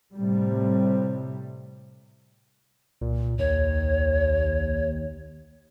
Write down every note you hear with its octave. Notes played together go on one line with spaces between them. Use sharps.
A2 C3 G3
C2 A#2
D#2 C#5